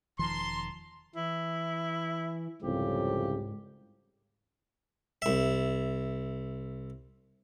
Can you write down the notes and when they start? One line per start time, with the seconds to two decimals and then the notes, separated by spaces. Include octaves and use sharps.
0.19 E1 D#3 F3 A5 A#5 C6
1.15 E3 E4
2.62 C2 F2 G#2 C#3 G4
5.22 C2 E5